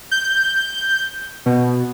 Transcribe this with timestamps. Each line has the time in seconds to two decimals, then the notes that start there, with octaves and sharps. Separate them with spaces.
0.11 G6
1.46 B2